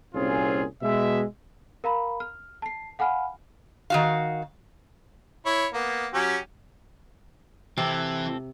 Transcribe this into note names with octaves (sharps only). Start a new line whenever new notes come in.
C2 A#2 C4 C#4 F4 G#4
B2 G#3 E5
A#4 F5 A#5 B5
F6
A5 C7
F5 F#5 G#5 B5 F6
D#3 F#4 F5
E4 C#5
A#3 B3
F#3 C#4 G4
C3 E3 C4 A4